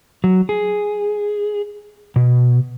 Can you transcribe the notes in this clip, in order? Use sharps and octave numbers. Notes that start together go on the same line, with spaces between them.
F#3
G#4
B2